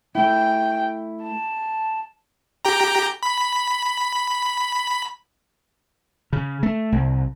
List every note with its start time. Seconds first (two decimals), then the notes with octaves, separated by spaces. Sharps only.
0.15 A3 E4 G5
1.22 A5
2.65 G4 G5 A#5
3.23 B5
6.33 C#3
6.63 A3
6.92 C2